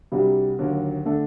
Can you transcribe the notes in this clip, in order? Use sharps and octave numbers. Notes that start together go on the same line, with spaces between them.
C2 C3 G3 D4 F#4
D#2 D3 F#3 A#3
D3 A3 D4 A4